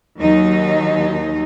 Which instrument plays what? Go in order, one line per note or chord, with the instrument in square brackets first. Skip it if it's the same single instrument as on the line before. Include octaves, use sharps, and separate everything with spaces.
[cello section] D#2 F#3 D#4